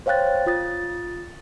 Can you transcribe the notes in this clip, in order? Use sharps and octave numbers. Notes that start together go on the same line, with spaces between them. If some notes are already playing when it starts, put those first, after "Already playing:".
C5 C#5 F5 G5 F#6 A6
F4 D#6 A6